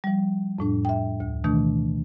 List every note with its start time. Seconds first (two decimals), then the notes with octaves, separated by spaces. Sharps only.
0.04 F3 G3
0.59 F2 A2 D4
0.85 E5 G5
1.20 D2
1.44 B2 D#3 E3 A3 D4